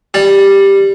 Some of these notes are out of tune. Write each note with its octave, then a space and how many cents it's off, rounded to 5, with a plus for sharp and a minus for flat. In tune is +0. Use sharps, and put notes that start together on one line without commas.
G3 +5